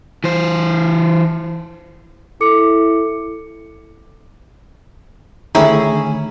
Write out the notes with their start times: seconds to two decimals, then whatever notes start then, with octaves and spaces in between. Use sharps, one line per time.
0.24 E3 C5
2.41 E4 A4 D6 C#7
5.55 D3 D#3 A3 C#4 E4 G4 G#4 A#5